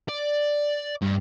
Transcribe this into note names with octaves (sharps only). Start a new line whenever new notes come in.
D5
G2